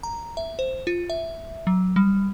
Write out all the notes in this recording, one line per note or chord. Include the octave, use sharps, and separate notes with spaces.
A#5
E5
C5
F4
E5
F#3
G3